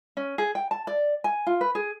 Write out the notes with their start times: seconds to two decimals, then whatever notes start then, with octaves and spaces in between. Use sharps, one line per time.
0.17 C#4
0.38 G#4
0.55 G5
0.71 A5
0.87 D5
1.24 G#5
1.47 F4
1.61 B4
1.75 G#4